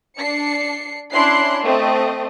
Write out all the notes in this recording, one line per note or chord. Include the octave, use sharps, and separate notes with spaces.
D4 C7 C#7
C#4 D4 E4 C6 F#6 C7
A3 C4 D#5